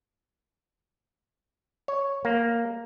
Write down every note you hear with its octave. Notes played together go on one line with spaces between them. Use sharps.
C#5
A#3